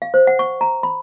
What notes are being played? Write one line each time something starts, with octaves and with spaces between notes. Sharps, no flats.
F5
C5
F#5
C#6
A#5
B5